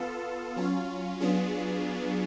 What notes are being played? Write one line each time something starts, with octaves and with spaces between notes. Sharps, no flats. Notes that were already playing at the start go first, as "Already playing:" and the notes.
Already playing: B3 F4 A4
F#3 C#4 F4
F#3 B3 D4 F4 G#4